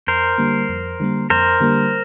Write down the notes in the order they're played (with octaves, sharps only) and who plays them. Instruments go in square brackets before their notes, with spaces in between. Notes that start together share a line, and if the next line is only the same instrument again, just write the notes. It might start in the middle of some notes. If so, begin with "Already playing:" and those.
[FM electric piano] F2 [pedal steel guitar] A#4 C5
[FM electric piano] D3 G3 A#3
F2
D3 G3 A#3
[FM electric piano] F2 [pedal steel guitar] A#4 C5
[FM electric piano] D3 G3 A#3